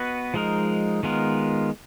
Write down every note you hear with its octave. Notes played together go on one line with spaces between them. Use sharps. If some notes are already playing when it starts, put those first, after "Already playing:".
Already playing: B3 F#4 B4 D#5
F3 G#3 D#4 A#4
D#3 G#3 B3 F4 A#4